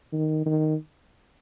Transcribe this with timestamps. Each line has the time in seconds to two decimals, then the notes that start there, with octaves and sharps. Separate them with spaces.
0.13 D#3
0.46 D#3